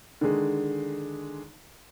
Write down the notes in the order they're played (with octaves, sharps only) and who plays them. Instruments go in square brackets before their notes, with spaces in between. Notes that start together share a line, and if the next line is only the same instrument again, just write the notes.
[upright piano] D3 D#3 G#3